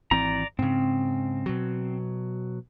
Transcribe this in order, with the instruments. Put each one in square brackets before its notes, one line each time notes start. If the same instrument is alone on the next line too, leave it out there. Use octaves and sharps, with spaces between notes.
[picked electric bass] G#1 E3 C4 [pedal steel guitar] D5 A#5
[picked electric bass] G#2 C#3 [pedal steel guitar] C4
[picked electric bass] B2 F#3